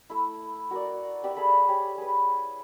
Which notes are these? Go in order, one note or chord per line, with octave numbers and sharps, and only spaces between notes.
A3 E4
F#4 A#4 D5
G4 D5 E5 F#5
G#4 A4 B5
G4 C#5
G#4 B4